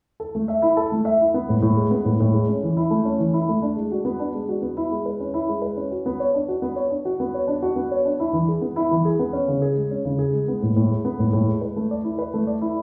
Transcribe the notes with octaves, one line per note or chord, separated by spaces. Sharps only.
A4
A3
E5
E4
A4
A3
E5
E4
B3
A2
A2
G#3
B3
A2
A2
G#3
C#4
E3
E4
A3
C#4
E3
E4
A3
D4
G#3
F#4
B3
D4
G#3
F#4
B3
E4
G#3
B4
C#4
E4
G#3
B4
C#4
F#4
B3
C#5
D4
F#4
B3
C#5
D4
F#4
B3
C#5
D4
F#4
B3
C#5
D4
E4
E3
G#4
B3
E4
E3
G#4
B3
C#4
C#3
G#4
G#3
C#4
C#3
G#4
G#3
B3
A2
A2
G#3
B3
A2
A2
G#3
B4
A3
D5
E4
B4
A3
D5
E4